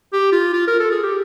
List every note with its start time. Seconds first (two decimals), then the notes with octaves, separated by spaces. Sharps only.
0.13 G4
0.32 F4
0.53 F4
0.67 A#4
0.79 A4
0.91 G#4
1.03 G4